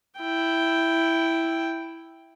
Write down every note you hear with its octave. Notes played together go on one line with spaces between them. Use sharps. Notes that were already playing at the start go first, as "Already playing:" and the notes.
E4 G5